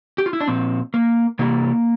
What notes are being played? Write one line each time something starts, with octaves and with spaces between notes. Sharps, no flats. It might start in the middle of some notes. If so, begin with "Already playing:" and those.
G4
F4
E4
D4
A#2 F3 C4
A#3
C3 E3 G3 A#3